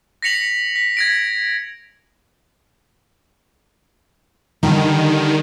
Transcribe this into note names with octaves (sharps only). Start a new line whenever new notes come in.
A#6 B6 C#7 F7 F#7
B6
G#6 A#6 D7
D3 D#3 G3